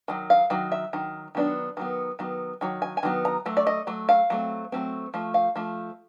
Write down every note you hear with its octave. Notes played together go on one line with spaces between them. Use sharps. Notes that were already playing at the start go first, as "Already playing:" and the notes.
D#3 F#3
F5
D#3 F#3
E5
D#3 F#3
D#3 F#3 B3 D4
D#3 F#3 B3
D#3 F#3 B3
D#3 F#3
G#5
G#5
D#3 F#3 B3
A#5
F#3 A3
D5
D#5
F#3 A3
F5
F#3 A3 C4
F#3 A3 C4
F3 A3
F5
F3 A3